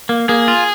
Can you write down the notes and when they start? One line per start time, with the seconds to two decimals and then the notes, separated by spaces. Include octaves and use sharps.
0.09 A#3
0.29 A#3 G#4
0.48 F4